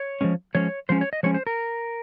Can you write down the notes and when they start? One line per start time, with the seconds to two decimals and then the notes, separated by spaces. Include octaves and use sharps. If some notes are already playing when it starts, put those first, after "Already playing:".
Already playing: C#5
0.21 F3 G#3 C#4
0.55 F3 G#3 C#4 C#5
0.89 F3 G#3 C#4 C5
1.01 C#5
1.13 D#5
1.23 F3 G#3 C#4 C#5
1.34 C5
1.47 A#4